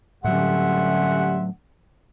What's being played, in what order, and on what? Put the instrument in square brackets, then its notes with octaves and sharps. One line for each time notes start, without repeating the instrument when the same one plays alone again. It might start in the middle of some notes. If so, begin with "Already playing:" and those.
[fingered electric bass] A2 F#3 [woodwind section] D3 C#4 F#5 [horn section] G3 E5 C6